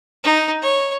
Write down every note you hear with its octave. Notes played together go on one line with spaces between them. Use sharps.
D#4
C#5